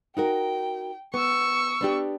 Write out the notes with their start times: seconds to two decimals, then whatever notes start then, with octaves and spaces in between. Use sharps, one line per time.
0.17 D#4 F#4 A#4 G5
1.14 B3 C#6 E6
1.81 B3 D4 G4